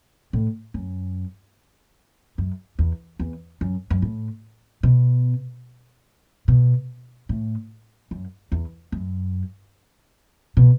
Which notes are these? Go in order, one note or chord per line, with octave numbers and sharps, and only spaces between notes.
A2
F#2
F#2
E2
E2
F#2
F#2
A2
B2
B2
A2
F#2
E2
F#2
B2